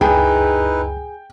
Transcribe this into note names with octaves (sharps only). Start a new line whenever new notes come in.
C#2 F#2 D#4 E4 G#4 B4 G5